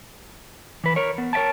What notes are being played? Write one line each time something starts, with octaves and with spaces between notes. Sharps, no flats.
E3 B4
A#4 C#5
B3
A#4 C#5 E5 G5 A5